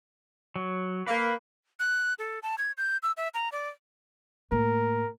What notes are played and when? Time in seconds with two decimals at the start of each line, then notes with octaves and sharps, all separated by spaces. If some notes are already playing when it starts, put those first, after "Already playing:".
0.56 F#3
1.06 A#3 B4
1.79 F#6
2.19 A4
2.43 A5
2.58 G#6
2.77 G6
3.03 E6
3.17 E5
3.34 A#5
3.52 D5
4.52 A2 A#3 A#4